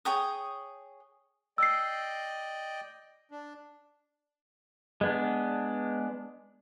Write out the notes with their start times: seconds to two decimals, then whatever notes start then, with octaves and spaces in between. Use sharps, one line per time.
0.05 G#4 C#5 G5 D#6
1.58 D5 D#5 G5 E6 C7
3.31 D4
5.01 G#3 B3 D4